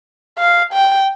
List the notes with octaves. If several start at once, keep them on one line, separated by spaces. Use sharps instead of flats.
F5
G5